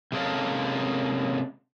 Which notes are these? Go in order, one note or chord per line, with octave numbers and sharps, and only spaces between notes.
C3 G#3 A#3 C#4 A4 F5